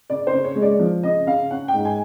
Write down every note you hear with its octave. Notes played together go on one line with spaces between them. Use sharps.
C#3 D5
C5
C#3
C#5
G#3
D5
F3
C#3 D#5
C#3 F5
C#4 F#5
G5
G#2
G#5